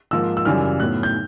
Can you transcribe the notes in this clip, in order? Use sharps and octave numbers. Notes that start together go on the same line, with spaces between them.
G#2 F3 A#3 D#4 E6
E6
F#2 C#3 E3 G3 F6
A2 F#3 B3 F#6
G6